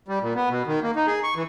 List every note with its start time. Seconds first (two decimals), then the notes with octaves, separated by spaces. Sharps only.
0.08 G3
0.22 A#2
0.35 B3
0.50 B2
0.67 D#3
0.82 A#3
0.96 D#4
1.07 G#4
1.23 C#6
1.35 E3